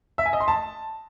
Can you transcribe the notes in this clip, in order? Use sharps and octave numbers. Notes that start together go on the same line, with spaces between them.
E5
G#5
D#5
C6
A5